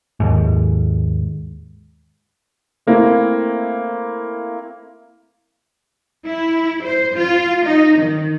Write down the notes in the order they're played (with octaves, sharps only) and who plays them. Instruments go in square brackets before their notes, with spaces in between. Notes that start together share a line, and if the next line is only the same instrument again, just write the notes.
[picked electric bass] D#2 G#2
[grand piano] A3 A#3 C4 E4
[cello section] E4
C5
F4
D#4
D#3